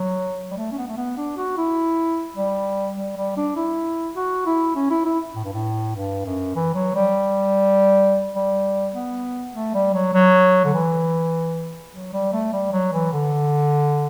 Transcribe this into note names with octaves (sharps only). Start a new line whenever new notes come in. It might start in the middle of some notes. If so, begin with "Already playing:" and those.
Already playing: F#3
G3
A3
C#4
B3
A3
B3
D4
F#4
E4
G3
G3
G3
D4
E4
F#4
E4
C#4
E4
E4
A2
G2
A2
G2
F#2
E3
F#3
G3
G3
B3
A3
G3
F#3
F#3
D3
E3
F#3
G3
A3
G3
F#3
E3
D3